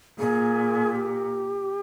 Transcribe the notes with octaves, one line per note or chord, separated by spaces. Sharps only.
A#2 G#4
G#4
G4